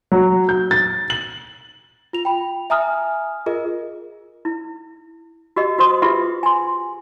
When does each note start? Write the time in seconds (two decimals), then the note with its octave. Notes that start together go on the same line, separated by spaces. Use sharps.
0.12 F#3
0.49 G6
0.71 A6
1.10 F#7
2.13 F4 F7
2.25 G5 B5
2.70 E5 G#5 A#5 D#6 F6
3.46 F4 G#4 A#4 D#5
4.45 E4
5.56 F#4 G4 D#5
5.78 F#4 C5 C6 D#6
6.02 F4 G4 G#4 B4 E5
6.43 G#5 C6